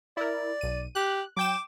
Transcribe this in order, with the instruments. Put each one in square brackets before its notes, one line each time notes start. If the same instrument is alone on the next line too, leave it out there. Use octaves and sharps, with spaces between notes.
[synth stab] E4 A#4 [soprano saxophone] D5
[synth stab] B1 D#7
[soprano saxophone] G4 [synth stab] F#6
[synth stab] F#3 G5 E7 [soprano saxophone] D6